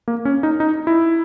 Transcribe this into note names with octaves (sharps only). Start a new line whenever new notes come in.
A#3
C#4
D#4
D#4
E4